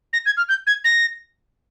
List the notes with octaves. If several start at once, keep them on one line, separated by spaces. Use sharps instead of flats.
A#6
G#6
F6
G6
G#6
A#6